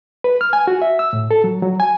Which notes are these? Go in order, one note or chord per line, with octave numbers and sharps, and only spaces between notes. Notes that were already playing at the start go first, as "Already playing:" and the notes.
B4
F6
G#5
F#4
E5
E6
A2
A4
F#3
F#3
G#5